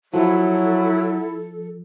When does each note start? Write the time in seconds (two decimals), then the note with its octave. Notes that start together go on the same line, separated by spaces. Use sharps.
0.14 F3 F#3 E4 A4